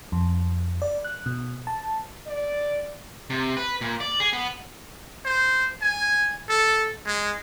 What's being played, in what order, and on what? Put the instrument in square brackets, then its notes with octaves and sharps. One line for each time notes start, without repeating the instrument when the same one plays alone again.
[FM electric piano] F2
D5
F#6
B2
A5
[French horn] D5
[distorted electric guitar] C3
B4
A#2
D5
G#4
B3
[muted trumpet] C5
G#5
A4
G#3